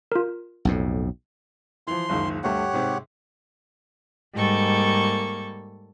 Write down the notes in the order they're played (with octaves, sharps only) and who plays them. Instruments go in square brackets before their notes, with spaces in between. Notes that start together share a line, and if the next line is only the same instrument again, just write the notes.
[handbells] F4 A#4
[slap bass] B1 F2 A2
[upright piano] E3 F3 [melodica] C6
[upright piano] F#1 C#2 D#3
[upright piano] D2 G2 A3 [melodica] G4 C#5 F#5
[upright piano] G#2 C3
[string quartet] G#2 G3 A#3 A4 C#6